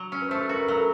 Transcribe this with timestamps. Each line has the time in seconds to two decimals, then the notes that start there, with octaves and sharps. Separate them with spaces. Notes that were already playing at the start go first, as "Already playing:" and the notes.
Already playing: F#3
0.12 C#4
0.22 B4
0.29 A3 C5
0.36 B4
0.49 F#4 A#4
0.59 B4
0.68 F#3 A#4
0.78 A4